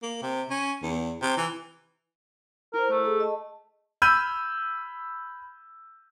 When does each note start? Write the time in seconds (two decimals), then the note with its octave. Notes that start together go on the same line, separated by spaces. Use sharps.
0.02 A#3
0.22 C3
0.50 C#4
0.83 E2
1.22 C3
1.37 E3
2.74 E4 A#4 C5
2.91 A3
3.05 G#4 A4
3.20 D#5 A5
4.02 B5 E6 F6 G6 D#7